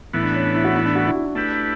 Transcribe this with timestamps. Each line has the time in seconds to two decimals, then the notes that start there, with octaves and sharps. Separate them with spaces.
0.13 A2 E3 B3 E4
0.23 D4
0.34 C#4
0.45 D4
0.55 E4
0.64 F#4
0.75 E4
0.85 D4
0.95 F#4
1.05 E4
1.15 F#4
1.25 E4
1.35 A3 D4 E4 G4 B4